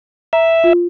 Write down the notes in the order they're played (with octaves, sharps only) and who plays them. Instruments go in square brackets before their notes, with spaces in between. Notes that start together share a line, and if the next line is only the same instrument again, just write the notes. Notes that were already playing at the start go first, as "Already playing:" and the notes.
[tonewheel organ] E5 [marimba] A#5
[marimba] F4